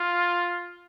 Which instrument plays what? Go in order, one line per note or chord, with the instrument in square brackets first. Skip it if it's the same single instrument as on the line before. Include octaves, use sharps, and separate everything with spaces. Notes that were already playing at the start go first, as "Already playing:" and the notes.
Already playing: [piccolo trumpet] F4